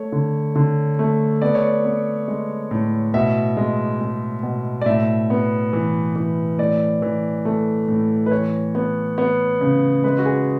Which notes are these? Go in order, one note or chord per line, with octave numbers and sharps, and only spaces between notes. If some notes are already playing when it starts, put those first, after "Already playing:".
Already playing: A3 C#5
D3
D3
A3
B3 D5
C#5
D5
B3
G#3
A2
B2 E5
G#3
G#3
B2
D5
A2 E5
B3
E3
E3
A2 D5
E3
A3
A2
B4
E3 C#5
B3
B3
C#3
G#3 B4
F#4
G#4